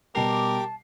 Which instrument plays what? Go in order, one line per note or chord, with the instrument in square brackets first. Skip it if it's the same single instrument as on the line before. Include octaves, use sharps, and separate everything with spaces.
[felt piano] B2 G3 C7 [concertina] G4 D6 [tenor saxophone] A#4 [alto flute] A5